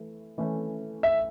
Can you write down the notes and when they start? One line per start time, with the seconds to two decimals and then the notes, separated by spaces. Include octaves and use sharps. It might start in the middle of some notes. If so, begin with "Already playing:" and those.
Already playing: E3 A3
0.38 E3 A3 C#4
1.03 E5